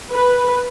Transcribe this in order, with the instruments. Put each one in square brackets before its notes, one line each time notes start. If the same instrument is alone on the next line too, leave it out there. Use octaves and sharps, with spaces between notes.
[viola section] B4